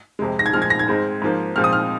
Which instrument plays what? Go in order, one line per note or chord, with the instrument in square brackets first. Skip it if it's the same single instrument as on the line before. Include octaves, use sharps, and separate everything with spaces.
[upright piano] F2 C3 G#3
A#6
G#6
A#2 F3 G#3 F6
G#6
A#6
G#6
G#2 G#3 C4
G#2 F3 A#3
A#2 F3 G#3 C4 F6
D#6
F6